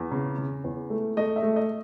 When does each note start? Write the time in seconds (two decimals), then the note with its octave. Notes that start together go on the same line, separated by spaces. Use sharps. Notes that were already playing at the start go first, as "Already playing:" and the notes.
Already playing: E2
0.11 C#3
0.38 C#3
0.64 E2
0.90 A3
1.17 A3 D#5
1.36 E5
1.42 A3
1.56 D#5